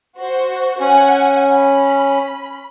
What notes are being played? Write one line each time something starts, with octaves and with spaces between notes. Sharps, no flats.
F#4 C5
C#4 F#5 G#5
B5